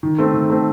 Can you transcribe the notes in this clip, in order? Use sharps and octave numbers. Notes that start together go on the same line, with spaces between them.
D#3
A3 C4
D#3
A3 C4